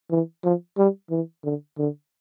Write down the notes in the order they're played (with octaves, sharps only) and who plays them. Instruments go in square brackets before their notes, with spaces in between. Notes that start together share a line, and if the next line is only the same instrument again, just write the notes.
[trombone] E3
F3
G3
E3
D3
D3